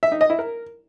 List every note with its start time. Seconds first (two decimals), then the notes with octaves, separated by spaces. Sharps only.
0.03 E5
0.12 D#4
0.21 D#5
0.30 E4
0.39 A#4